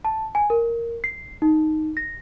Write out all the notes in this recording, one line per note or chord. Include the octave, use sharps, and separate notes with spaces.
A5
G#5
A#4
C7
D#4
A#6